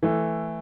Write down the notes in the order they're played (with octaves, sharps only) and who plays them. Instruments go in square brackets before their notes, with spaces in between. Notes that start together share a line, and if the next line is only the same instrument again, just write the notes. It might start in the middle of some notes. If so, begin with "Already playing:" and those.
[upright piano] E3 A3